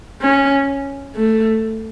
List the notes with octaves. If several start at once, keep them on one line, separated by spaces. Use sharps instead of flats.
C#4
A3